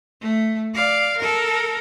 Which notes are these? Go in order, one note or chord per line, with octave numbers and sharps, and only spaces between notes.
A3
D5 F5
A4 A#4